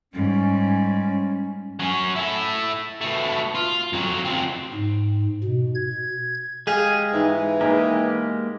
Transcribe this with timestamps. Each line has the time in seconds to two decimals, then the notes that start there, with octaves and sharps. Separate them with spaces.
0.13 G#2 G3 C#4
1.79 F#3 C#4
2.16 E4 A4
3.01 B2 A3
3.55 F4
3.93 F2 F#3
4.25 C#2 C4
4.74 G#2
5.44 B2
5.75 G#6
6.67 G#3 G4 G#4 F5
7.13 G#2 E3 B3
7.61 G#3 A#3 D#4 G4 G#4 B4